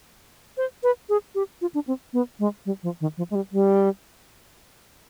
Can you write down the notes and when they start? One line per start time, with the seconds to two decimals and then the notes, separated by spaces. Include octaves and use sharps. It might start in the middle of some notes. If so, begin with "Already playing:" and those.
0.57 C5
0.83 B4
1.09 G#4
1.35 G4
1.61 F4
1.74 D4
1.87 C4
2.13 B3
2.39 G#3
2.66 G3
2.83 F3
3.01 D#3
3.17 F3
3.30 G#3
3.35 G3
3.52 G3